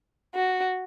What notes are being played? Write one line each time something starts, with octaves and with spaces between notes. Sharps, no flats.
F#4